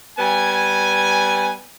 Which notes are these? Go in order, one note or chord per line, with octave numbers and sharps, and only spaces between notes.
G3 B3 G#5